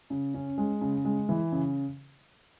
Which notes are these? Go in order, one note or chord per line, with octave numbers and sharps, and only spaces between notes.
C#3
C#4
G#3
C#3
G#3
E3
C#3